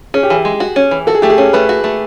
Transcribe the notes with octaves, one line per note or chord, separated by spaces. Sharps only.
C#4 G#4
G4
E3 G#4
G#3
F#4
C#4
E3
F#4 A4
G#4
A3 G4
G#4
C#4
A3 B4
F#4
A3